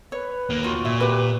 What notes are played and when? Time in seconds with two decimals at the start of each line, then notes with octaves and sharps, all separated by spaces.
0.12 B4 C#5
0.50 D#2 A#3
0.64 F4 F#4
0.85 A#2 E5
1.00 G4 B4